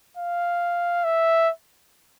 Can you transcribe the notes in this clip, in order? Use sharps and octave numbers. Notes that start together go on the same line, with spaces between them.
F5
E5